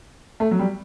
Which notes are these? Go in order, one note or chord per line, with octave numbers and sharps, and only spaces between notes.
A3
F#3
G3